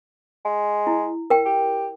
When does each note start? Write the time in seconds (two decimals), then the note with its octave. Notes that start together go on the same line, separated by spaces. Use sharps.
0.45 G#3
0.87 E4
1.30 A#4 G5
1.45 G4